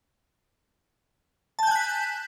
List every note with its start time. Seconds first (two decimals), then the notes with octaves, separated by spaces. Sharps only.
1.59 A5
1.63 G6
1.67 G#5
1.71 F#6
1.75 B6